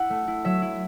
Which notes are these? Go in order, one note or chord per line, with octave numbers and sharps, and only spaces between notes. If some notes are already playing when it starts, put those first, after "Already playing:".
Already playing: E4 F#5
A3
E4
F#3 E5
E4